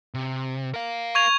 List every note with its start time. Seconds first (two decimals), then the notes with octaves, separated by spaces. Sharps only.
0.14 C3
0.74 A#4 F5
1.15 C#6 G#6 F7